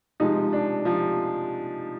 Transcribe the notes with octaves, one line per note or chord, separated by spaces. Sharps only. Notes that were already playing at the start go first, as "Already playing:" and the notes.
C3 F3 G#3 D#4
D4
C3 F3